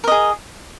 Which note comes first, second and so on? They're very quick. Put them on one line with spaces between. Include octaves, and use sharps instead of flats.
A#4 D#5 G#4